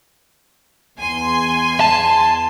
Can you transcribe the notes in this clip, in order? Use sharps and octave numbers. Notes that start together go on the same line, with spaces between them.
E2 G#5 C6
A5